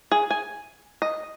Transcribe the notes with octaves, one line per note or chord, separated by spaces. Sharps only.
G#4
G#5
D#5